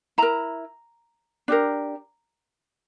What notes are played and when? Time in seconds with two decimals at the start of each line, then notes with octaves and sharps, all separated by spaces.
0.18 E4 A#4 A#5
1.48 D4 G4 A#4